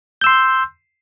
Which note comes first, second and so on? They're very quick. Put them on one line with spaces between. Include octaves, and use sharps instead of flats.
G6 E6 C6